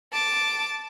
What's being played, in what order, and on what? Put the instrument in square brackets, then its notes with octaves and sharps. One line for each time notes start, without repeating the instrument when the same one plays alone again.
[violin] A5 D6